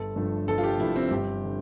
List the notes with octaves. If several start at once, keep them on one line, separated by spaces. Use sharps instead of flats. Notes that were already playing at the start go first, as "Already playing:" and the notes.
Already playing: G1 A4
G2 F3 A3
G1 A4
F4
G4
G2 F3 A3 E4
C4
G1 G4
D3